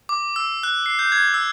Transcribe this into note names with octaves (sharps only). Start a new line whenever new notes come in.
D6
E6
F#6
C7
G6
G#6
E6